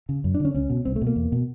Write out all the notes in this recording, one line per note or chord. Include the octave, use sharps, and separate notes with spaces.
C#3
F#2
D4
D3 C#4
C#2 C#4
B2
C2 C4
A3
B2
A#3
E2
B2